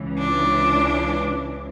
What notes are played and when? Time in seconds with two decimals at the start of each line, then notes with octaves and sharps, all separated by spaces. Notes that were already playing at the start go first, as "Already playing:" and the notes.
Already playing: C#2 C#3 E3
0.19 D4